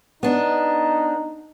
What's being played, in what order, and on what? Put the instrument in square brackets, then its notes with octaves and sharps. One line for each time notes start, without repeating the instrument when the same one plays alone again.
[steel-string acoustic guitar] B3 D4 [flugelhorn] D#4